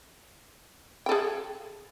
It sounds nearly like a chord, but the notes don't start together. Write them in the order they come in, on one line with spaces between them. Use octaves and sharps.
G5 A4 G#4